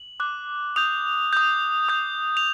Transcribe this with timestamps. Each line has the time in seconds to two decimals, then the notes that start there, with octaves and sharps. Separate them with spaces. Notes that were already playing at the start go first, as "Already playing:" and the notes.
Already playing: F#7
0.20 D6 F#6
0.76 D#6 G6 F7
1.33 D#6 G6
1.89 D#6 G6
2.37 F7